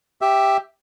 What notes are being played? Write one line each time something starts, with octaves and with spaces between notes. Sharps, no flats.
G4 E5